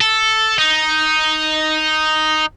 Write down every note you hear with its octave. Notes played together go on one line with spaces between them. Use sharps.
A4
D#4